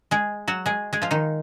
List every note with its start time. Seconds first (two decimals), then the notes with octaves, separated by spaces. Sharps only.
0.11 G#3 G#4
0.48 F#3 F#4
0.66 G#3 G#4
0.93 G#3 G#4
1.02 F3 F4
1.11 D#3 D#4